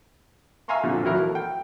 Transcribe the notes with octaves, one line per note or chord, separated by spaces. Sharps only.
E5 F5 G#5 A#5 C6 C#6
F2 A#2 D3
D#2 E3 F#3 E4 A#4
A3
G5